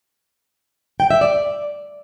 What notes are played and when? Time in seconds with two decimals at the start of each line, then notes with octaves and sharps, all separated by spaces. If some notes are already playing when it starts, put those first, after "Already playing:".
1.00 G5
1.11 E5
1.21 D5